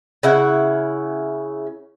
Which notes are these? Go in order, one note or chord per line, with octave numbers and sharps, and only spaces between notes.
C#3 E4 F#5